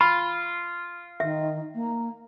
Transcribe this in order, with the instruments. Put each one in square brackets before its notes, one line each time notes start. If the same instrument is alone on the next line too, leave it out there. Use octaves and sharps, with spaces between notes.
[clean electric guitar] F4 [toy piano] B5
[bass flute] D#3 [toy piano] E5
[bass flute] A#3